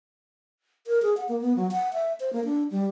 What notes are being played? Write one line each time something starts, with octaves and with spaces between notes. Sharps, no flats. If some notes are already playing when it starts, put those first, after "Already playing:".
A#4
G#4
F#5
A#3
B3
F#3
F#5
E5
C5
A#3
D4
G3